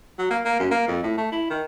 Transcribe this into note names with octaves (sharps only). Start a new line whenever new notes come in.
F#3
A#3
A#3
F#2
A#3
F2
A2
A3
E4
D#3